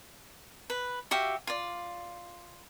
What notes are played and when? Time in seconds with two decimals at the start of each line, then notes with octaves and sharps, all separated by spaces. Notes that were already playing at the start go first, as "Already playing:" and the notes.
0.70 B4
1.11 F#4 G4 E5 F5
1.47 F4 D5